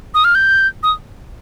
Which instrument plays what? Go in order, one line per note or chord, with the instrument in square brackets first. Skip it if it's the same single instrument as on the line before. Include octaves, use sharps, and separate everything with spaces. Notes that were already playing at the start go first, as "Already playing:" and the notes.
[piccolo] D#6
F6
G6
D#6